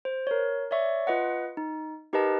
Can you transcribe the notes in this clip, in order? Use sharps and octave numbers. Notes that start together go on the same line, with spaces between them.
C5
A#4 C#5
C#5 D5 E5 C#6
F4 B4 D#5 F#5
D#4
D#4 G4 A#4 B4 D#5 A5